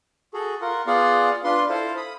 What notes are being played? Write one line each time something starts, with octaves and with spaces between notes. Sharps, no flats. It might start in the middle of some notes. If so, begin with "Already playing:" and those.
F#4 G#4 A4
F4 A#4 F#5
B3 F4 G#4 D5 F5 F#5
D4 F4 B4 C6
E4 A4 C5 F5
B5 D#6